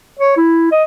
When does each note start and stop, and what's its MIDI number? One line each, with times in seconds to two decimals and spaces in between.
0.19 0.34 73
0.37 0.71 64
0.72 0.84 75